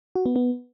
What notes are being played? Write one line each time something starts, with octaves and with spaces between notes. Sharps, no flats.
F#4
B3
B3